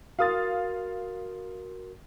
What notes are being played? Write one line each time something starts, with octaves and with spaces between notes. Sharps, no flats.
F#4 A#4 F5 C6 D#6 A6